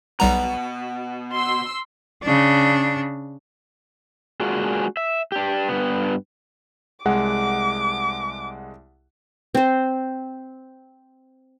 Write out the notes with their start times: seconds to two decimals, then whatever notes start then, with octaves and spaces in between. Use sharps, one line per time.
0.20 B1 B2 G3 B3 A#5
1.34 C6 E6
2.23 C#3 D4
4.40 G#3 A#3 D4 F4 F#4 G#4
4.97 E5
5.32 D4 G4
5.69 G2 B3
7.05 C2 G#3 F#5 D6
9.55 C4 C5